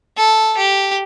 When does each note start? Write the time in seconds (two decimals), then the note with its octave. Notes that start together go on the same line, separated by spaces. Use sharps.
0.17 A4
0.57 G4